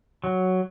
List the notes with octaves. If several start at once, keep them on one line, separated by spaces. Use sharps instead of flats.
F#3